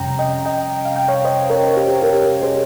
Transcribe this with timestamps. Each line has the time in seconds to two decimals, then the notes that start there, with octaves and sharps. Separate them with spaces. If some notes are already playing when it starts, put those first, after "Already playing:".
Already playing: F2 C3 G3 C#4 G5 A#5
0.19 D#5 G5
0.45 D#5 G5
0.85 F5
0.96 G5
1.08 C#5 F5
1.24 C5 D#5
1.50 A#4 C#5
1.77 G4
2.02 G4 A#4
2.42 G#4 C5